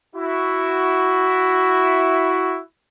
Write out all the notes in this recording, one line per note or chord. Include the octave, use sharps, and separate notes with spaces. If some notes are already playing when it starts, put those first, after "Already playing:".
E4 F#4